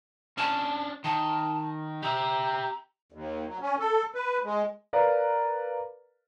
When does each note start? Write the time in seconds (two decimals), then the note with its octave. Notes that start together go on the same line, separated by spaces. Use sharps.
0.38 C#4 D4 A5
1.04 D#3 A5
2.03 G4 E5 A#5
3.12 D#2
3.47 F#3
3.61 C#4
3.79 A4
4.14 B4
4.44 G#3
4.93 A#4 B4 D5 F5 A#5